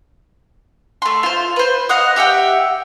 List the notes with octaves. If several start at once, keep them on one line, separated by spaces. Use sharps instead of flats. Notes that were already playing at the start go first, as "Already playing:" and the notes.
A3 C6
F4 C5
B4 C5
D#5 F5 F#5 D#6
G4 E5 F#5 G5